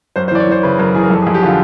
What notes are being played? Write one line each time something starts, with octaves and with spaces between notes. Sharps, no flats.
F#2 C5
C5
E3 D5
C#5
E3 C5
C#3 B4
F#2 A#4
E3 G#4
A#4
F2 A4
G#4
F2
G4
D3 F4